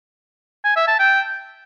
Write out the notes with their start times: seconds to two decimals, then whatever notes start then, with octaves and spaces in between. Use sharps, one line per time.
0.64 G#5
0.76 E5
0.87 A5
0.99 G5